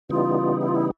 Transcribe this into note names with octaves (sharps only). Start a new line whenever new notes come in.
C#3 E3 G3 B3 D#4 F4
E4
F4
E4